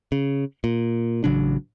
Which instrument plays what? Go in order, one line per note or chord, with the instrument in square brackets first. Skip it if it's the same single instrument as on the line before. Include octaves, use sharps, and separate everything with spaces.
[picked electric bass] C#3
A#2
A1 C#3 F#3 D4